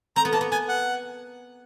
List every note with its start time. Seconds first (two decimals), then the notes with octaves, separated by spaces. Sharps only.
0.16 C4 A#5
0.25 B3
0.33 A#3 A5
0.41 B3
0.52 B3 G#5
0.69 F#5